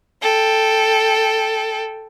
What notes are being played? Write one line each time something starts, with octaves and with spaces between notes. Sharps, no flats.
A4 G5